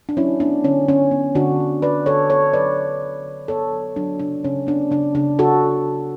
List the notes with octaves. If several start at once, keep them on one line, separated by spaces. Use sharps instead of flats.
D4
F#3 C#4 E4
B3 D4
D3 C#4
D3 C#4
B3
D3 D4 F#4
D3
D3 B4 D5
D3 A4 C#5
B3 A4 C#5
F#3 B4 D5
F#3
D3
D3
B3 A4 C#5
F#3
F#3 D4
C#3 D4
C#3 C#4
B3 D4
C#3 D4
C#3 D4
C#3 F#4 A4